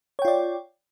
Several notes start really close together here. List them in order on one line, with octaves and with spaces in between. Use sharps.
C#5 G5 F4 D5